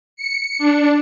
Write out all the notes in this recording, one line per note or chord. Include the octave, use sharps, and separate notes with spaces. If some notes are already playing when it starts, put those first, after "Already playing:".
C#7
D4